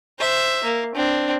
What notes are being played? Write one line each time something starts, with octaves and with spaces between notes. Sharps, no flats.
C5 E5
A#3
C4 D4